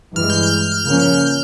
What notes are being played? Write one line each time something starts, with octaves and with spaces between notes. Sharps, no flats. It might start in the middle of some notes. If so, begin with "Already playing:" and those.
G2 E3 G#3 F6
G6
F6
G6
F6
C#3 F3 A#3 C#4 G6
F6
G6
F6